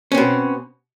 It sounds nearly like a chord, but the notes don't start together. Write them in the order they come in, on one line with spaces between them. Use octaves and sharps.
C#4 C4 B2